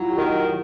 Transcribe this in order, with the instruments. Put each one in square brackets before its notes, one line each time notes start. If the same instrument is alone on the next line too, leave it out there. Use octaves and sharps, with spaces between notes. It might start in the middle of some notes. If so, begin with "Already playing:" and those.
Already playing: [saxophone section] F#3 [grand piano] E4 F4
[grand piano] G4
[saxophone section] D#3 [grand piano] F#4